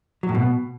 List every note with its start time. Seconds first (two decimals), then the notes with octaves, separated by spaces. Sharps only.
0.23 F#3
0.29 A2
0.35 B2